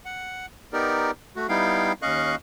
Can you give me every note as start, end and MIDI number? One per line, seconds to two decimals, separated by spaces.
0.05 0.46 78
0.73 1.11 59
0.73 1.11 63
0.73 1.11 67
0.73 1.11 70
0.73 1.11 74
1.36 1.47 57
1.36 1.47 66
1.49 1.92 55
1.49 1.92 59
1.49 1.92 63
1.49 1.92 64
1.49 1.92 77
1.49 1.92 79
2.02 2.35 39
2.02 2.35 61
2.02 2.35 75
2.02 2.35 77
2.02 2.35 85
2.02 2.35 90